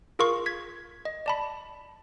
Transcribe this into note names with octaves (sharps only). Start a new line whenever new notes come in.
F4 G#4 A#4 F5 C6 C#6
G#6 B6
D#5
D5 A5 B5